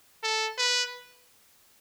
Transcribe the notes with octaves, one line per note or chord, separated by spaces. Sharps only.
A4
B4